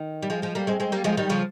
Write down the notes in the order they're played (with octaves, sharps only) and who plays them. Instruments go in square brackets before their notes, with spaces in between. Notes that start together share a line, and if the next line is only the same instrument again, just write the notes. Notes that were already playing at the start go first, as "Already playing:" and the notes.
Already playing: [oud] D#3
G3
F3 G#3
F3 G#3
G3 A#3
G#3 C4
G#3 C4
G3 A#3
F3 G#3
D#3 G3
C#3 F3